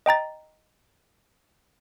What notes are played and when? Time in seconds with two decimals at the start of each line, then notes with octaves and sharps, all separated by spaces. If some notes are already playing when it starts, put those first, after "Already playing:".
0.06 D#5 G5 A#5 A6